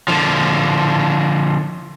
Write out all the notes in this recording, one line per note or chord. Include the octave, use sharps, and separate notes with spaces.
D3 F3